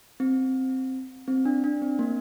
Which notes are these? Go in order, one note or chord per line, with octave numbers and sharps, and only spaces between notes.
C4
C4
D4
D4
C4
A#3